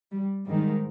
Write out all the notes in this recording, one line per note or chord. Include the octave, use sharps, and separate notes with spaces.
G3
G#2 D#3 G3